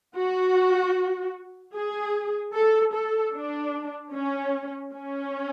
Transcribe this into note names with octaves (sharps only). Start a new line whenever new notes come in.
F#4
G#4
A4
A4
D4
C#4
C#4